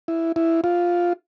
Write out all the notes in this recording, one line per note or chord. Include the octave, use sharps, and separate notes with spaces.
E4
E4
F4